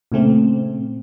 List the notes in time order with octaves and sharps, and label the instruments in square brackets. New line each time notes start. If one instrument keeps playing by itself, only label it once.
[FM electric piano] A#2 C#3 A3 C4